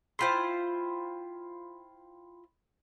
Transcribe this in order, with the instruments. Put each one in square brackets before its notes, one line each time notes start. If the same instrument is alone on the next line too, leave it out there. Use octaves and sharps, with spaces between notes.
[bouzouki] E4 F4 C5 [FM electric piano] G5 B5 C6